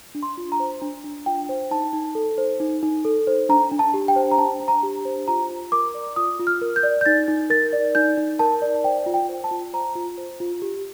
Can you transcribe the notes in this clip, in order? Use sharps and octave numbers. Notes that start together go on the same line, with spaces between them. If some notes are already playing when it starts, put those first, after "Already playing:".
D4
C6
F4
A#5
C5
D4
D4
F4 G5
C5
D#4 A5
D#4
A4
C5
D#4
D#4
A4
C5
D4 A#5
D4
A5
G4
G5
C5
A#5
D4 A5
D4
A#5
G4
C5
F4 A#5
F4
A#4 D6
D5
F4 D#6
F4
F6
A#4
G6
D5
G6
D#4 A6
D#4
A#4 A6
D5
D#4 G6
D#4
A#4 A5
D5
C5 G5
F4
G5
C5
A5
F4
C5 A#5
F4
C5
F4
G4